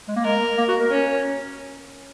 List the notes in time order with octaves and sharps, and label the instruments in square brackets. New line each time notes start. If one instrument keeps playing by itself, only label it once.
[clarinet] G#3
A#3
[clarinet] G#3 [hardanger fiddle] A#4
[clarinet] A#3
F#4
A#4
[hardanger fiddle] C#4